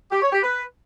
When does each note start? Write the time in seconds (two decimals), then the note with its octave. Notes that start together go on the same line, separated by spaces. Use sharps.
0.12 G4
0.22 C#5
0.32 G4
0.43 B4